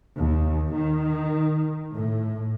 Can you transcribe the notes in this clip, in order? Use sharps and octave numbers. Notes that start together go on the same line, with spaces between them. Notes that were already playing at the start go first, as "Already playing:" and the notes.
D#2
D#3
A2